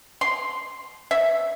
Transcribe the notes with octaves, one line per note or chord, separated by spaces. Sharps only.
C6
E5